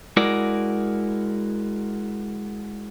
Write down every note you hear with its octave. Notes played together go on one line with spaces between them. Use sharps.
G#3 E4 F#4 A#4 D5